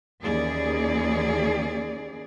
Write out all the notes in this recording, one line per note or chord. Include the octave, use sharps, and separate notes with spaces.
D#2 E3 C#4 G#4 D5